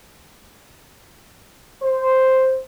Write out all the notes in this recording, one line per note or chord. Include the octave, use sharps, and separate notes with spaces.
C5